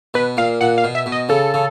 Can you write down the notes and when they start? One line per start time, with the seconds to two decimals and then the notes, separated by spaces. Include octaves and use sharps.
0.14 B2 B4
0.37 A#2 F5
0.61 A#2 F#5
0.78 F5
0.84 B2
0.95 E5
1.06 B2
1.12 D#5
1.29 C#3 A4
1.54 C#3